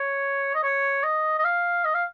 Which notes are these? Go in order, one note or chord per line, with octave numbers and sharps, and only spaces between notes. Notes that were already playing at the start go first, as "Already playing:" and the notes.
Already playing: C#5
D#5
C#5
D#5
D#5
F5
D#5
F5